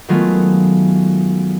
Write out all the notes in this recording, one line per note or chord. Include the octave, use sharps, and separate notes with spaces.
D#3 F#3 G#3 A3 B3 F4